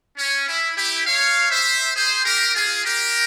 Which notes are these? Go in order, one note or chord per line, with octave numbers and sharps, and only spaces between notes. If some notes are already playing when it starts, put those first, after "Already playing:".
C#4
E4
E4 G4
C#5 F5
C5 E5
G#4 C5
G4 A#4
F4 G#4
G4 A#4